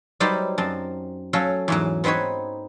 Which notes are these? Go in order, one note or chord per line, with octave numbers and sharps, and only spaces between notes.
F#3 G3 D#4 B4 C5 D5
F#2 C4 A5
F#3 C#4 A4 C#5 F5
E2 G#2 F#3
B3 C4 D#4 B4 C#5